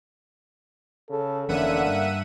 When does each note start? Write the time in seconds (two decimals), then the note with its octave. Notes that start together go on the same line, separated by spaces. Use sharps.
1.10 C#3 A4
1.49 F1 D3 E3 A#3 C#4 E5 F#5 D#7
1.86 G2